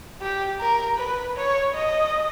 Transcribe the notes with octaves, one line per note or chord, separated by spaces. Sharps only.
G4
A#4
B4
C#5
D#5